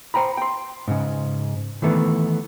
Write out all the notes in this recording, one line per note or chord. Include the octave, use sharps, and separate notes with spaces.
C5 G5 A#5 B5
G5 C6
G#2 C#3
D#3 E3 A3 B3